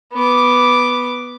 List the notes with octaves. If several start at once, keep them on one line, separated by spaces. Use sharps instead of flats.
B3 D6